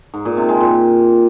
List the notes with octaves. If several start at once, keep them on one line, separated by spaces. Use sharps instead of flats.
G#2
A#2
C3
G#3
A#2